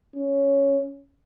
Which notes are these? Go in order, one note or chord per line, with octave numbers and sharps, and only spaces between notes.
C#4